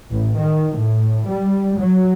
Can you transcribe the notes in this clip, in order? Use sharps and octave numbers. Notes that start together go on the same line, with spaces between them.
A1
D#3
A2
G3
F#3